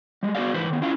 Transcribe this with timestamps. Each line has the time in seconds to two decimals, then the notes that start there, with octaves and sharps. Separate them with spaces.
0.23 G3 G#3
0.35 B3 F#4 G#4 D5 F5
0.54 G#2 E3 B4 C5
0.70 D#3 B3
0.82 C#4 E4 F4 F5